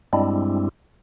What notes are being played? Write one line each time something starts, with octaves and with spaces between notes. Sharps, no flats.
G2 G3 G#3 C4 D4 E4